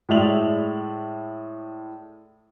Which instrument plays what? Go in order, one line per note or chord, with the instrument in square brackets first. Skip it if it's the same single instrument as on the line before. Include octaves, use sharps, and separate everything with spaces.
[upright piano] A2 G#3 D5 E5 F7 F#7